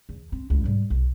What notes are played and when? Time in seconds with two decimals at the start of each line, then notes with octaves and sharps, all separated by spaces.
0.09 E2
0.32 C4
0.50 C#2 E4
0.64 G#2 G3
0.90 B1